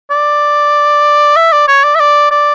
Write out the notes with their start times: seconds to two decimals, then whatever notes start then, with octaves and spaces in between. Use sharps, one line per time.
0.11 D5
1.36 E5
1.52 D5
1.68 C#5
1.84 D5
1.95 E5
2.00 D5
2.31 D5